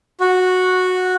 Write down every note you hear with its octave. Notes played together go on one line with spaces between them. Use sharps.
F#4